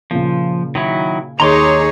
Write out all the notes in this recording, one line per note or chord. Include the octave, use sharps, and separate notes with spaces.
A#2 C#3 F3
D#3 F#3 E4
D#2 D#4 G#4 C#5 A#5 C6 D6